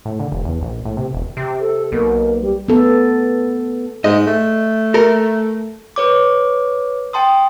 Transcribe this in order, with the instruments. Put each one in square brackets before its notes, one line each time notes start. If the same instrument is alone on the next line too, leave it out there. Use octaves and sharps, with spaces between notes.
[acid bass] A2
D3
F1
E2
A#1
A2
C3
E1
C3
[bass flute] A4
[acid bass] B1 [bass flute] A#3
[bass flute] G3
[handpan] B3 A4
[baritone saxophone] G#2 [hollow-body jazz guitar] D#5
[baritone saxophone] A3
[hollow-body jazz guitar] A4 A#4
[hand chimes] B4 C#5 D6
G5 A5 C6 D#6